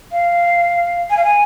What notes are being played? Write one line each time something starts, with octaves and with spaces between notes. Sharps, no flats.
F5
G#5
F5
G#5